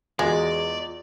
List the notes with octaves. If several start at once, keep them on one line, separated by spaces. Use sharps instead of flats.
E2 G#3 F4 F#4 D5 D#5